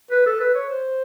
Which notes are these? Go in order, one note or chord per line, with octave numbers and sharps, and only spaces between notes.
B4
A4
B4
C#5
C5